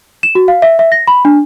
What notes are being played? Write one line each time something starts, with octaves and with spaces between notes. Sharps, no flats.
E7
F#4
F5
E5
E5
A#6
B5
D4